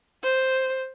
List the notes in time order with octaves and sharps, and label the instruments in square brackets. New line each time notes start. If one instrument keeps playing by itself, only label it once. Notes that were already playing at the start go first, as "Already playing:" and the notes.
[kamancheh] C5